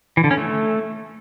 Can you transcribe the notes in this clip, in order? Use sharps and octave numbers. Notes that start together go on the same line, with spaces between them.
E3
D3
C#4
A3